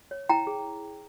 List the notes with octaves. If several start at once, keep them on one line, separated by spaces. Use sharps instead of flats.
C#5
E4 G5 A#5
G#4